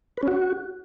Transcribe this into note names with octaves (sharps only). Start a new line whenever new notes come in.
B4
C#4
F#4